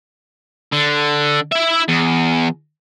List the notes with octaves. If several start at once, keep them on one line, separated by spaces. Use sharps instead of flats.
D3
E4 E5
E2